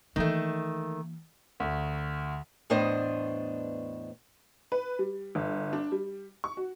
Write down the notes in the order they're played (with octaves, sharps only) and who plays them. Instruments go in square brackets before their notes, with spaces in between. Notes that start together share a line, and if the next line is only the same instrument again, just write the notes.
[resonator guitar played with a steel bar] D#3 A3 [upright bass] E3 A#3
[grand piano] D2
[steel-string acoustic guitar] E2 A2 B3 D4 C5 D#5
[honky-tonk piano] B4
G3
G1
D4
G3
C#6
F#4